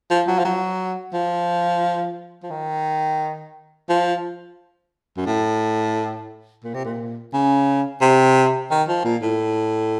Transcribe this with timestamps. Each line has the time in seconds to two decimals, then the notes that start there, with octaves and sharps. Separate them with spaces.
0.10 F3
0.28 F#3
0.39 F3
0.45 F#3
1.14 F3
2.43 F3
2.51 D#3
3.89 F3
5.17 F#2
5.26 A2
6.64 A#2
6.74 C3
6.85 A#2
7.34 C#3
8.01 C3
8.71 D#3
8.89 F3
9.05 A#2
9.23 A2